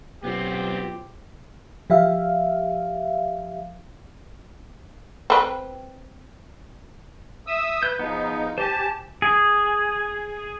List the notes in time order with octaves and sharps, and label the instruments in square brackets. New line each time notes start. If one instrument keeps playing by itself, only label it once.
[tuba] B1 [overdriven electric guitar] B3 C4 [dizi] F4 [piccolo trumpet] G4
[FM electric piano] F3 G4 E5 F5
[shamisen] C4 B4
[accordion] E5 D#6 E6
[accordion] B4 [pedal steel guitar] G6
[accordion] F3 D#4 [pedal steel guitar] B3 G#4
[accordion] G4 A5 [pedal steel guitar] C5 G#5
[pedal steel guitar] G#4